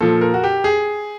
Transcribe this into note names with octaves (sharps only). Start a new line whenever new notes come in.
A#2 F3 A4
A#4
F#4
G4
G#4